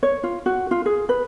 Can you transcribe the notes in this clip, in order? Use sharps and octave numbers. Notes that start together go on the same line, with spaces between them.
C#5
F4
F#4
F4
G#4
B4